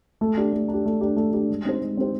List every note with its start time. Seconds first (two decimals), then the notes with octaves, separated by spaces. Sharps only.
0.21 A3
0.37 D4 G4
0.53 A3
0.68 D4
0.73 G4
0.86 A3
1.01 D4 G4
1.17 A3
1.33 D4 G4
1.50 G#3
1.65 C4 D#4 G4 C5
1.82 G#3
1.97 C4 D#4 G4 C5